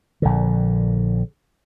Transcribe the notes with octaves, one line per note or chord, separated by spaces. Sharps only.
A#1 D3